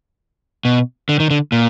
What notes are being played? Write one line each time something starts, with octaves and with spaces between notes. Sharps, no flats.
B2
D3
D#3
D3
A#2